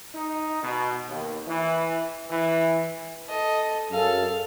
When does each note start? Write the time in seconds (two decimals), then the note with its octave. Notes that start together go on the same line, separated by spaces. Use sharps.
0.14 D#4
0.61 B2
1.08 D#2
1.47 E3
2.30 E3
3.28 A4 D#5
3.91 F#2 G#4 A4 F5